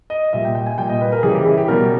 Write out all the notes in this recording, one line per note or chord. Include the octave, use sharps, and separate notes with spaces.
D#5
A#2 G3 E5
G5
G5
G#5
A#2 G3 G5
D#5
B4
A#4
C#3 E3 G3 G#4
G4
E4
G4
B2 G3 A#4